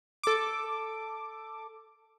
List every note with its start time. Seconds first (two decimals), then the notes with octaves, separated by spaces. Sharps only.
0.23 A4 D6